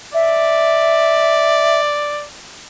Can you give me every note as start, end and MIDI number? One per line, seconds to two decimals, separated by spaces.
0.14 2.27 74
0.14 1.80 76